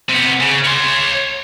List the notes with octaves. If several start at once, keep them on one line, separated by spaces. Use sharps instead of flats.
C3 B3
C#3
C#5 C6